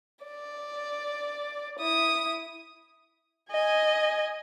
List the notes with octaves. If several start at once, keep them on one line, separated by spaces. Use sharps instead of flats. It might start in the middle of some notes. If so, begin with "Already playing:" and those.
D5
E4 D#6
D#5 G#5